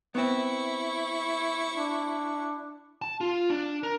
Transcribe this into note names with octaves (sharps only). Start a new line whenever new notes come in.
B3 C4 E4 C#6
D4
A5
F4
D4
A#4